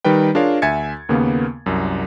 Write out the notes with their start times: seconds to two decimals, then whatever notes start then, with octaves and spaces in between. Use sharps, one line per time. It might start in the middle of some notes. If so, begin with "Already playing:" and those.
0.05 D#3 G3 D#4 B4 G5
0.35 D4 F4 G#4 A#4 C#5 F5
0.62 D2 E5 G#5 G#6 A6 C#7
1.09 D#2 C#3 A#3 B3
1.66 C2 F#2